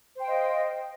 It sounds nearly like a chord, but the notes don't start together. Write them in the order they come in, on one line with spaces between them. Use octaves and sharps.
C5 G5 F5 D#5